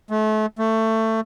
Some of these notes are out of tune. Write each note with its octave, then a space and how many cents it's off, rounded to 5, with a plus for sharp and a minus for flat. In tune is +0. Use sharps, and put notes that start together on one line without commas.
A3 -35
A3 +15